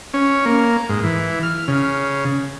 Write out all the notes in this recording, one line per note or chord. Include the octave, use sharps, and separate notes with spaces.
C#4
A#3
G#2
E3
F6
C#3